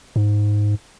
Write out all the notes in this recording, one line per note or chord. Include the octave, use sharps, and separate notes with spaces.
G#2